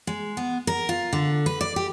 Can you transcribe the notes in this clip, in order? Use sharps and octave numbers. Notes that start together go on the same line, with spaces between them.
G#3
B3
A#4
F4
D3
B4
D5
G4